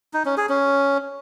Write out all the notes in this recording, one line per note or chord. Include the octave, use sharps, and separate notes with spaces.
D#4
C#4
G#4
C#4